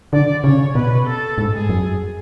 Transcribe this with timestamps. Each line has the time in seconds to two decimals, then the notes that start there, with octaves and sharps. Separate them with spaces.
0.13 D3 D5
0.44 C#3 C#5
0.75 B2 B4
1.06 A4
1.38 G#2
1.54 G#4
1.69 F#2